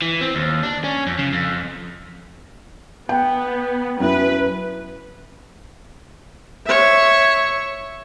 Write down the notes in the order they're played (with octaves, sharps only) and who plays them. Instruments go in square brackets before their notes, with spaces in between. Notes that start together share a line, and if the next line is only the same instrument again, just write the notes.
[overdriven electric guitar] E3
C4
D#2
D4
C#4
F2
C#3
F2
[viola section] B3 [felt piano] G5
[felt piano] F#2 E4 [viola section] B4
[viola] C#5 E5